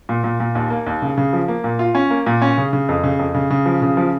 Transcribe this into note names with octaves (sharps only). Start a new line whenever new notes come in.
A#2
A#2
A#2
D#2
A#3
D#2
C#3
C#3
F3
A#3
A#2
F4
C#4
A#3
A#2
C#4
C#3
C#3
F2
C#3
F2
C#3
C#3
F3
C#3
F3